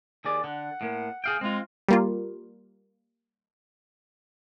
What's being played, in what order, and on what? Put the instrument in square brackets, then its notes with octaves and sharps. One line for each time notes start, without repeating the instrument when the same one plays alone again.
[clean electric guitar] D#2 G#4 D5
[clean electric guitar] D3 [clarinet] F#5
[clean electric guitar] A2 A#3
G#4 F5 G5
[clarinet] G#3 [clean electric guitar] C4 F4
[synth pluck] G3 A#3 F4